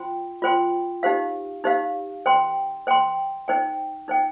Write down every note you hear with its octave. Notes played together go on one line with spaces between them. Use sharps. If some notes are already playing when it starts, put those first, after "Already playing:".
Already playing: F4 C5 G5 C6
F4 C5 G5 C6
D#4 G4 C5 F5
D#4 G4 C5 F5
C5 G5 C6
C5 G5 C6
D#4 C5 G5
D#4 C5 G5